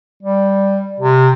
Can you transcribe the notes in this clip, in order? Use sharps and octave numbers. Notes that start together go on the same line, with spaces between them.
G3
C3